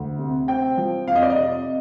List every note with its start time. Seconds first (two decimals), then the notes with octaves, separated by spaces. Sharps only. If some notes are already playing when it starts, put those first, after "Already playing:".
Already playing: D2
0.19 C3
0.48 C4 G5
0.77 F3
1.07 F2 F5
1.15 D#5
1.23 D5
1.30 D#5
1.37 C3